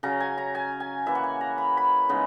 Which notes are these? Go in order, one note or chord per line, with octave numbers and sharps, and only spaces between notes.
C#3 F#3 C#4 A#5
G#5
A#5
G#5
G#5
E3 A#3 E4 E5
F#5
G#5
A#5
B5
B5
C#3 G#3 B3 D#4